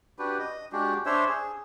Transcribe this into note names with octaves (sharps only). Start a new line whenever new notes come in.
D4 F#4 G4 B4
D#5
G#3 D4 F#4 G4
D4 C5 C#5 E5
G#4